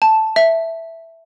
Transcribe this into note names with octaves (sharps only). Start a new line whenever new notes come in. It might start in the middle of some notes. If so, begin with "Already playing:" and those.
A5
E5